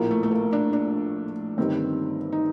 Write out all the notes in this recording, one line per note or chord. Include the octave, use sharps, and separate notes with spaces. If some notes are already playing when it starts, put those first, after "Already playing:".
Already playing: A#1 A2 F3 A#3
A3
A3
A#3
D4
D4
G1 G2 D#3 G3 C4
D#4